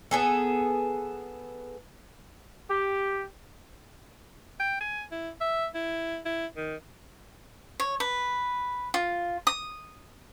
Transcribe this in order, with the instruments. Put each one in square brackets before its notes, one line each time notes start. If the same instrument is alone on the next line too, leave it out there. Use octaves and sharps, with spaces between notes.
[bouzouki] B3 G#4 A4
[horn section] G4
[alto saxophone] G5
G#5
E4
E5
E4
E4
D#3
[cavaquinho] C#5
B4
F4
D#6